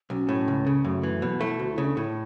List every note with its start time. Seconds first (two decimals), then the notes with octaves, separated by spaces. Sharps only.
0.10 B1 C#4
0.29 A2
0.48 C#2
0.67 C#3
0.85 F#2 A3
1.03 E3
1.22 B2 F#3
1.41 A3 E4
1.59 D2 F#4
1.72 E4
1.78 C#3
1.84 D4
1.97 A2 E4